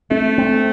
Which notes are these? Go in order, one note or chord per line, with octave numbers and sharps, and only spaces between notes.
A3 C4
C4